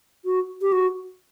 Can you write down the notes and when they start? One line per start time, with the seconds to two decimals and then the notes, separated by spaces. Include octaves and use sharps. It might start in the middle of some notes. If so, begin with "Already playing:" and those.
0.25 F#4
0.61 G4
0.72 F#4